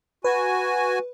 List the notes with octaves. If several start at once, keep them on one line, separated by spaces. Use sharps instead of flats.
F#4 B4 G#5